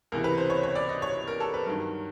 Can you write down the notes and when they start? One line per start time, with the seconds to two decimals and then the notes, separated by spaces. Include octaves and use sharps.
0.12 C#2 C3 E3 A#4
0.24 B4
0.38 C5
0.50 C#5
0.63 C#5
0.76 D5
0.89 D#5
1.02 C#5
1.28 A#4
1.40 A4
1.54 B4
1.66 G2 D#3 F#3 A#4